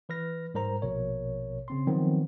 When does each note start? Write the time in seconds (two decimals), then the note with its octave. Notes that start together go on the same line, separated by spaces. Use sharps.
0.09 E3 B4 F6 A#6
0.54 G#2 G3 A#4 C5 A#5
0.82 A#1 B2 A#4 C#5
1.68 C#3 C4 C6
1.87 D#3 F3 F#3 B3 C4